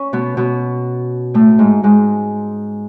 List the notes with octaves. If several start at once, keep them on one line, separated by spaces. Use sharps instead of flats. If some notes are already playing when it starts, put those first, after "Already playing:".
Already playing: C#4
B2 B3
B2 B3
A2 A3
G#2 G#3
G#2 G#3